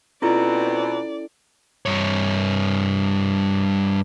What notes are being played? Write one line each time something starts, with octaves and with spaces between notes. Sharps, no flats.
B2 C4 C#4 E4 F4 A4 D5 A#5
G2 C#5